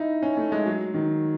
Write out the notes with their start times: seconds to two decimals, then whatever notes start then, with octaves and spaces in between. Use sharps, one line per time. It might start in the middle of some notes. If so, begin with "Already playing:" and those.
Already playing: D#4 E4
0.22 C#4
0.37 A3
0.52 G#3
0.66 F#3
0.94 D#3